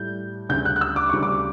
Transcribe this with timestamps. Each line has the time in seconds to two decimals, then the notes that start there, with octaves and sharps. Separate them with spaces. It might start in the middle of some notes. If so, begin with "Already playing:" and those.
Already playing: A2 G3 G6
0.49 D2 C#3 G3 G6
0.65 F#6
0.76 F#6
0.81 E6
0.96 D6
1.09 D2 C#3 G3 C#6
1.23 D6